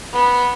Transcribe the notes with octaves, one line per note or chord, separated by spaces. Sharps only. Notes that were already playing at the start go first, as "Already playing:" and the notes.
B3